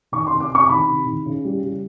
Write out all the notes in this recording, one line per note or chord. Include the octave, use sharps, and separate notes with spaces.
D#3 C#6
C6
C3
D6
C3 C#6
D#3 B5
C3
D#3
C#3
G3
G3